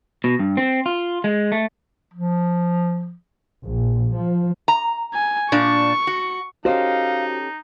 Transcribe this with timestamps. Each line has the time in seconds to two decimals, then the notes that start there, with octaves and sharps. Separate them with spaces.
0.24 B2
0.39 G2
0.57 C4
0.86 F4
1.24 G#3
1.52 A3
2.14 F3
3.64 A#1
4.16 F3
4.68 A#5
5.14 G#5
5.52 A#2 D4 C#6
6.07 F#4
6.65 C#4 D#4 F#4 G4 A4 C5 D#5 F5